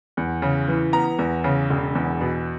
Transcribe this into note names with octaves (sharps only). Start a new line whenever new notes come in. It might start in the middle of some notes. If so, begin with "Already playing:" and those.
E2
C#3
E3
B3 A#5
E2
C#3
E1
E2
B2